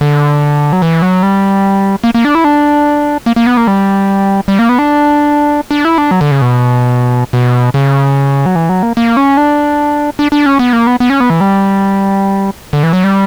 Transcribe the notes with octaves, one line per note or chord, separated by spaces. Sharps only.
D3
F#3
E3
F#3
G3
A#3
A#3
D4
E4
D4
A#3
A#3
B3
A#3
G3
G3
A#3
B3
D4
D4
E4
D4
F#3
D3
C#3
B2
B2
C#3
F#3
E3
F#3
A#3
A#3
C#4
D4
D4
D4
C#4
B3
A#3
B3
B3
C#4
B3
E3
G3
D3
E3
F#3
G3